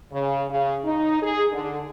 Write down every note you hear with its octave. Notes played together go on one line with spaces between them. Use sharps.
C#3
C#3
D#4
G#4
D3